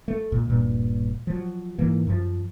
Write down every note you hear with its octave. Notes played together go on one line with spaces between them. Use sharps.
A3
C#2 A#2
D#1 G2 A#2
F3 F#3
G#2 E3 A#3
F#2 F3